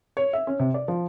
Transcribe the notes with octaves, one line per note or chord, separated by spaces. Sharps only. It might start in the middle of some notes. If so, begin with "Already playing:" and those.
C#5
E5
C#4
C3
D5
F3